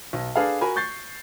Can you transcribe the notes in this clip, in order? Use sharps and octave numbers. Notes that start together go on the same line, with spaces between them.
B1
D4 G#4 A4 B4 F5
F#4 A#4 G#5 B5
C#6 G6 A6 C7